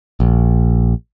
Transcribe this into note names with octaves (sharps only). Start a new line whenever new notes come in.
A#1